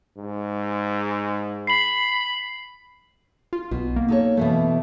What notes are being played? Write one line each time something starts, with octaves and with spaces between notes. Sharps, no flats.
G#2
B5 C7 F#7
F4
B1 B2
A#3
D#4 A4 C#5
B2 E3 A3